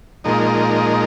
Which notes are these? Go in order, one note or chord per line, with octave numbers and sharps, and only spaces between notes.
A#2 F3 G#3 D#4 A#4